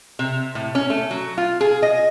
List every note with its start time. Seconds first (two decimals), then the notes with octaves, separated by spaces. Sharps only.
0.19 C3
0.55 A2
0.75 C#4
0.90 A3
1.11 F#3
1.38 F4
1.61 G#4
1.82 D#5